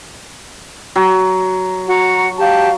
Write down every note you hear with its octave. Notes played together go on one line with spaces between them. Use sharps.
F#3
F#4 A#5
G4 F5 A5